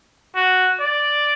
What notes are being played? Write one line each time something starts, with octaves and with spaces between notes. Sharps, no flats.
F#4
D5